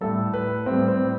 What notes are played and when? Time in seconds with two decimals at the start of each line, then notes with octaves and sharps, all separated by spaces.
0.01 A2 G3 A4
0.34 B4
0.66 A2 G3 C4
0.88 C4